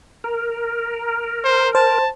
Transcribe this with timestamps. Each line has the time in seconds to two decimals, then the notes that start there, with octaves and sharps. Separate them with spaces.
0.24 A#4
1.44 C5
1.75 C5 A5